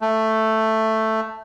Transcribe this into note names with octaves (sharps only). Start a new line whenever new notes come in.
A3